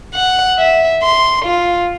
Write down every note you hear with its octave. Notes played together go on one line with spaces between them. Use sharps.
F#5
E5
C6
F4